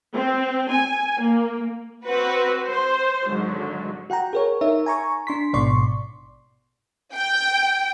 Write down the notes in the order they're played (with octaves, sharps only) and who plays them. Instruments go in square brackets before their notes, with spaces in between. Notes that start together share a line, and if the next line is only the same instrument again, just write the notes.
[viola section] C4
G#5
A#3
[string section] C4 F#4 B4
C5
G#1 D3 F#3
[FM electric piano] F#4 F#5 G5 A#5
G#4 A#4 C#5
D#4 A#4 C#5 E5
G#5 A#5 C#6
D4 C6 B6
A1 G#2 B2 D5 C6 C#6
[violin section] G5